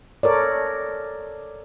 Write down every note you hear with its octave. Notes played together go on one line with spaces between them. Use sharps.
A4 A#4 C#5 D5